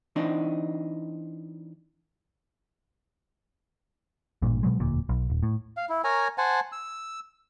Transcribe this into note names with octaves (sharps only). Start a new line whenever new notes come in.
E3 C4 D4 D#4
A1 G2 A#2
B2 F#3 G#3
E1 D2 A#2
B1
D#1
A2
F5
E4
A#4 C#5 G#5 A#5
C5 F#5 G#5 A5
E6